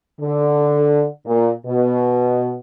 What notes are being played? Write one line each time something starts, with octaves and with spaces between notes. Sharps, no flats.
D3
A#2
B2